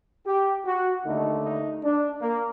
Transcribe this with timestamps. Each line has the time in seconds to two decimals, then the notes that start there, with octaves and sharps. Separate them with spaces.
0.26 G4
0.66 F#4
1.05 D#2 D3 A3 D#4
1.44 D#4
1.83 D4
2.22 A#3